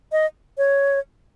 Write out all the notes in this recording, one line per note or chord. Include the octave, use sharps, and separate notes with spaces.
D#5
C#5